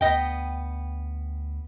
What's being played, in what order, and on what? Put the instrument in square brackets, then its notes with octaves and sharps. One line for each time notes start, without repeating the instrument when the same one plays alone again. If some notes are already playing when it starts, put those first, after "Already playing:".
[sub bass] D2 [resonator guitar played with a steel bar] B3 D#5 G5